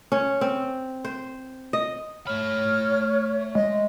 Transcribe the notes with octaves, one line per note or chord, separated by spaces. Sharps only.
C#4
C4
C5
D#5
A3 C#5 B5 F6
G#3 D#5